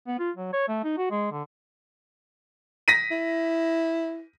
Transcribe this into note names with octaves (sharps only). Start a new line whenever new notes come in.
B3
F4
F#3
C#5
A3
D#4
F#4
G#3
D3
A#6 B6 D#7
E4